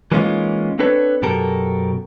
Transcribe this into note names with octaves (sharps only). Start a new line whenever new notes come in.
E3 G#3 A#3 C#4 D#4 F4
C4 D4 A4 B4 C#5
F#2 B2 G4 A4 A#4